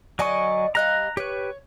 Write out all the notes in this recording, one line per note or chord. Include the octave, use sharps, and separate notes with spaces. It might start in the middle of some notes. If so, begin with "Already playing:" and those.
D3 F#3 D5 D#5 G#5 C#6
G3 D#5 F5 A#5 F#6
G4 B4 C#5